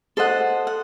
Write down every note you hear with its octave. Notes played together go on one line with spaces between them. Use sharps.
A4 C5 D#5 F#5
F#5